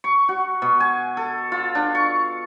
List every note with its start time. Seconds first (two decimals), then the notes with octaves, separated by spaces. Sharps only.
0.04 C#6
0.29 F#4
0.62 B2
0.80 G#5
1.17 A4
1.52 F4
1.75 D4
1.95 C#6